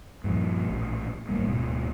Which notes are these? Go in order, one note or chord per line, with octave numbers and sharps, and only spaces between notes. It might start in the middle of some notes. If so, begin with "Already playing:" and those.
G2 A#2 F3
A#1 A2
G#1 A2 G3 A#3
D1 G#2 B2